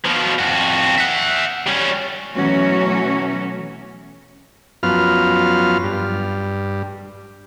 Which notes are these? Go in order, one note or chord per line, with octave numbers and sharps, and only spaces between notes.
B2 F3
F2 F#4
E5 F#5
G3 C#4
B2 E3 F#3 A3 C#4 F#4
F#2 F3 B3 F4 F6
G2